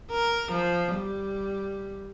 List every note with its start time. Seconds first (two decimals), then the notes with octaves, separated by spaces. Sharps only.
0.11 A#4
0.51 F3
0.95 G3